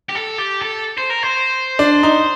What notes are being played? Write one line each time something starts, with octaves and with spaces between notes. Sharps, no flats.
G4
A4
G4
A4
C5
A#4
C5
D4
D#4